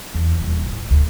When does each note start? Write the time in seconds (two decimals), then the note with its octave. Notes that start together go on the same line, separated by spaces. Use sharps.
0.14 E2
0.39 D#1
0.66 A2
0.90 D2